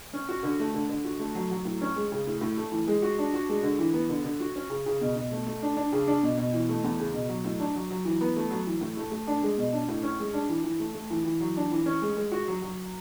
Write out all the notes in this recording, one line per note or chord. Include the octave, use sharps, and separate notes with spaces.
C#4
F#4
D3
A3
D3
D3
F#4
A3
F#3
F#3
A2
C#4
G#3
C#3
A2
A2
A3
E3
G#3
F#4
D4
F#4
G#3
D3
E3
B3
D3
D3
F#4
C#4
C#3
C#3
B2
B2
A3
A3
D4
D4
C#3
D4
B2
B2
E3
A3
E2
C#3
B2
F#3
A2
D4
F#3
F#3
E3
B3
A3
F#3
E3
A2
A3
A3
D4
G#3
B2
D4
A2
C#4
G#3
D4
E3
E3
A3
A3
E3
E3
F#3
D4
E3
C#4
G#3
G#3
F#4
F#3
F#3